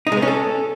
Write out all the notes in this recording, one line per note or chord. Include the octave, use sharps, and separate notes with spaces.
D#4
G#3
B3
C#4
A4